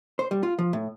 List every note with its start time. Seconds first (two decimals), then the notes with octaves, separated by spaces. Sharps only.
0.19 C5
0.31 G3
0.43 F4
0.59 F3
0.73 A2